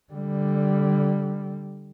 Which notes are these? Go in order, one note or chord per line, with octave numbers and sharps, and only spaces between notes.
D3 G3